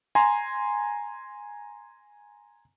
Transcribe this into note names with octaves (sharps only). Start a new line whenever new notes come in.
G#5 A#5 C6